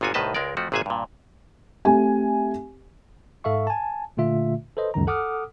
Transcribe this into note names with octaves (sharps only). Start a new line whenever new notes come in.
G1 A#2 F4 F#4 G#5
C2 A2 D#3 B4 D#5 A5
C#2 G#3 A#4 D5
F2 F3 A3 F#4
G#1 A#2 G#4 B4 E5 G#5
G2 A#2
A3 C4 G4 G#5
G#2 A4 E5 F5 C#6
G#5 A5
A#2 D3 A3 F4 E5
A4 B4 C5 D#5
C#2 F#2 D#3 A#5
A4 F#5 D6 D#6 F6